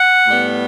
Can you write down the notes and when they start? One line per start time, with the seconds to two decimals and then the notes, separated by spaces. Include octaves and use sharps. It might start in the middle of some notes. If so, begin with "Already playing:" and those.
Already playing: F#5
0.27 A2 G3 B3